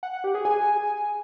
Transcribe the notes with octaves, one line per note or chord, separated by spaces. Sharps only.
F#5
F#5
G4
G#4
G#5